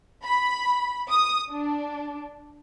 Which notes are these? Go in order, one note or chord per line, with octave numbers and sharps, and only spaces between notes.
B5
D#6
D4